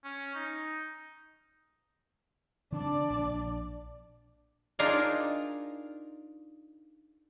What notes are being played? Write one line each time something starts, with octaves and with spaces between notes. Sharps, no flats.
C#4
D#4
C#3 E3 C4 D4 D5
A#1
D4 D#4 F4 G#4 A#4 D5